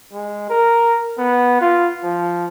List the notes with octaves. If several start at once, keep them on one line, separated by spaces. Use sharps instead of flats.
G#3
A#4
B3
F4
F3